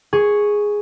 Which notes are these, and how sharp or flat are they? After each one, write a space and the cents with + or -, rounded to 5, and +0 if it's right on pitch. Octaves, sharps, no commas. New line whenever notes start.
G#4 +0 C#6 +0